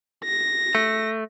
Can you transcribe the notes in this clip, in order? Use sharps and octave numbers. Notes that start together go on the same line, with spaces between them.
A#6
A3